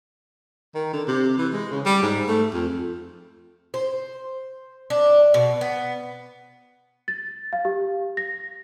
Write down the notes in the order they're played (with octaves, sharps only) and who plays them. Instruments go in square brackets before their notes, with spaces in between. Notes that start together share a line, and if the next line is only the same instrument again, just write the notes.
[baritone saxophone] D#3
D3
C3
E3
G#3
C#3
G3
G#2
A3
F2
[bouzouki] C5
D4
B2
B3
[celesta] A6
F5
G4
A#6